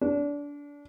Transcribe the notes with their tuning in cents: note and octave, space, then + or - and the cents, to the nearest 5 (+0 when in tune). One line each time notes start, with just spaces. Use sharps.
D4 -25